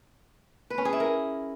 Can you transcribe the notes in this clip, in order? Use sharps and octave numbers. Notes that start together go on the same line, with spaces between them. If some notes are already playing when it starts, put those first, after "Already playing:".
B4
C#4
G#4
E4
A#4